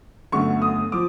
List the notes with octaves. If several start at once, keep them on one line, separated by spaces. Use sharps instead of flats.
G1 F#2 D3 F#3 A3 C#6
D#6
F3 D6